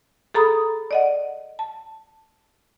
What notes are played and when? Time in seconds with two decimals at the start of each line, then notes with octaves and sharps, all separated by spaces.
0.34 G#4 A4 A#5 B5 D#6
0.91 D5 D#5 F#5
1.59 A5